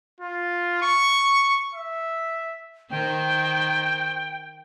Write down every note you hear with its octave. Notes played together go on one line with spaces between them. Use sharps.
F4
C#6
E5
D#3 C5 G5